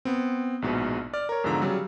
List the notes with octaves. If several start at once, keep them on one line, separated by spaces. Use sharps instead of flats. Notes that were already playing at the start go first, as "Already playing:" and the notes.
B3 C4
A#1 G#2 B2
D5 F6
A#4 C#5
E2 G#2 D3 F3 A#5 E6
C#3 F#3 G3